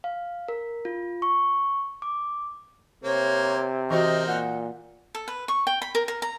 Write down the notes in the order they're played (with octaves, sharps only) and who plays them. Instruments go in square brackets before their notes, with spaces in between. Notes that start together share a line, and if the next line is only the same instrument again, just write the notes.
[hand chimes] F5
A#4
F4
C#6
D6
[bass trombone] C3 [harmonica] A#3 C5 [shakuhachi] C#5
[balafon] E3 F#4 [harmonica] C4 D#4 A#4 [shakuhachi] D#5
[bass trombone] A#2 [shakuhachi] F#5
[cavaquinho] A4
B4
C#6
G5
B5
A#4
A#4
A#5